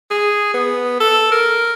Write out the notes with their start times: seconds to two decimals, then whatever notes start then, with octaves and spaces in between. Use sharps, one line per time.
0.11 G#4
0.54 B3
1.00 A4
1.32 A#4